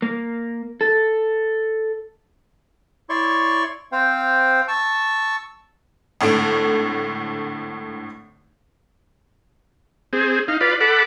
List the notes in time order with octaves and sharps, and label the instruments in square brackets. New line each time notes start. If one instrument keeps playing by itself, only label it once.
[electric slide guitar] A#3
A4
[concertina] E4 C#5 D5 C6 C#6
C4 C5 F5 G5
A5 C#6 E6
[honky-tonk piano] G#1 A2 D3 A3 D7
[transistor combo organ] C4 G#4
D#4 F5
F4 B4 D5
A4 F#5 B5 D6